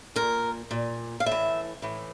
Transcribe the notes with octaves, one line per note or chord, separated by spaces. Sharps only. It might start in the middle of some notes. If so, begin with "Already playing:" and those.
A#2 A#4
A#2
F5
A2 E5
E3
A2 E3